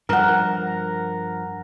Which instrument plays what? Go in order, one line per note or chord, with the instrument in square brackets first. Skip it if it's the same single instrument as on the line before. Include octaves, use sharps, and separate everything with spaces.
[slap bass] G2 F3 [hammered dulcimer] A#4 F#5